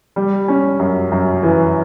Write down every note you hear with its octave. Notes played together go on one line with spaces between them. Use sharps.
G3
C#4
F#2
F#2
E3